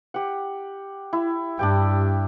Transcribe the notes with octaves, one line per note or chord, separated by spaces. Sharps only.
G4 F#5
E4
G2 D4 G4 G5